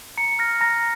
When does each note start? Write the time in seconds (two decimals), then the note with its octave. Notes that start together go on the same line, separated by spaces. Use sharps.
0.17 A#5 C#7
0.39 F6 A#6
0.61 A#5 A#6